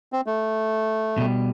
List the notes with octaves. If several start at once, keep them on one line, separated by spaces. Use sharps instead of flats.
C4
A3
B2 G3